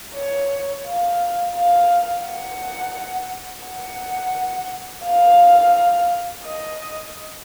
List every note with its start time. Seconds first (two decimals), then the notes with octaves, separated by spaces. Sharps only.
0.15 C#5
0.86 F5
1.55 F5
2.24 F#5
3.65 F#5
5.05 F5
6.45 D#5